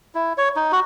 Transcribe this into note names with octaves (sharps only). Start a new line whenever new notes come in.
E4
C#5
D#4
F#4